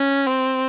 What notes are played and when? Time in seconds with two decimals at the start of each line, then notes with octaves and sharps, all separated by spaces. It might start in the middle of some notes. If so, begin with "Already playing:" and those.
Already playing: C#4
0.27 C4